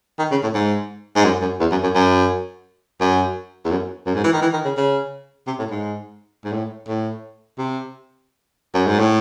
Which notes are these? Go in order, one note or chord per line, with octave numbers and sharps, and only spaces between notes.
D#3
C#3
A2
G#2
G#2
F#2
F#2
E2
F#2
F#2
F#2
F#2
E2
F#2
F#2
G#2
E3
D#3
E3
D#3
C#3
C#3
C3
A2
G#2
G#2
A2
A2
C3
F#2
G#2
A2